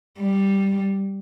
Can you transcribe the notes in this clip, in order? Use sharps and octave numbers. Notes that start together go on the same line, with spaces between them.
G3